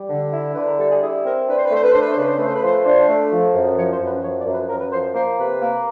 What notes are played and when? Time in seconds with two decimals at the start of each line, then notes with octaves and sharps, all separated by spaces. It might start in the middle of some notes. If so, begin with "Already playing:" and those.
Already playing: G3
0.09 D3
0.32 E4
0.55 D3 B4
0.67 A#4
0.78 G3 A4
0.89 G#4
1.01 E4 G#4
1.24 C4 A#4
1.47 D4 B4
1.56 C5
1.65 B4
1.70 A3 C5
1.83 B4
1.92 D4 C5
2.01 B4
2.10 C5
2.16 C#3 B4
2.28 C5
2.37 A3 B4
2.46 C5
2.54 B4
2.62 F3 C5
2.72 B4
2.84 D4 C5
3.08 A3
3.31 F3
3.54 F#2
3.77 F3 C#5
3.92 C5
4.00 F#2
4.07 B4
4.23 F3 C#5
4.38 D5
4.46 F#2
4.53 B4
4.68 F#2 A#4
4.80 B4
4.92 F3 C5
5.14 A#3 C5
5.37 C3 B4
5.61 A#3